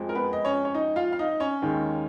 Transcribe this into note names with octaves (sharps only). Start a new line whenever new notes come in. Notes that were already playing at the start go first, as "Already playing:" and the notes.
Already playing: F2 F3 G#3
A#4
B3 B4
D#5
C#4 C#5
C#5
D#4 D#5
F4 F5
F5
D#4 D#5
C#4 C#5
D#2 D#3 G#3